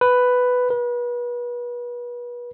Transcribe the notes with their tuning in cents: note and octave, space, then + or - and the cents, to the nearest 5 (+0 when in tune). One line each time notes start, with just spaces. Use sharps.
B4 +5
B4 -35